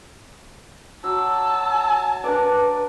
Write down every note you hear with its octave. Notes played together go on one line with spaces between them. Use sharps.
F#3 A5 D6 E6
D4 A#4 B4 D5